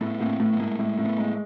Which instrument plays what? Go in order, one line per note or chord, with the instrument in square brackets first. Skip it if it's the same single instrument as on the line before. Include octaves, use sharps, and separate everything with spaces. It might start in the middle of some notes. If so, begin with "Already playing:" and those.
[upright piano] A2 [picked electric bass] A3 B3
[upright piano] A2 [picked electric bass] A#3 C4
[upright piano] A2 [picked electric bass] A3 B3
[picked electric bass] B3
[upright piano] A2 [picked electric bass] G#3 A#3
[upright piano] A2 [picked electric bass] G#3 A#3
[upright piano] A2
[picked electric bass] A3 B3
[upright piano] G#3